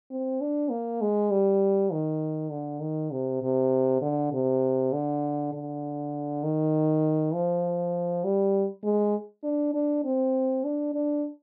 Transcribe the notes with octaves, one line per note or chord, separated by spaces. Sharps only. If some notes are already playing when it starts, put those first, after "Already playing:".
C4
D4
A#3
G#3
G3
D#3
D3
D#3
C3
C3
D3
C3
D3
D3
D#3
F3
G3
G#3
D4
D4
C4
D4
D4